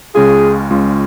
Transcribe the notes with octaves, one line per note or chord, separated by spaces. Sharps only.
C#2 C#3 G#3 C#4 F4 G#4
C#2 C#3 G#3 C#4 F4